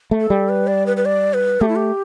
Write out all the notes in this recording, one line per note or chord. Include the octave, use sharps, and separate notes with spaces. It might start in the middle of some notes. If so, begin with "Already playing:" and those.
A3
A4
G3
B4
D5
B4
B4
D5
B4
A3 G4
E4
G4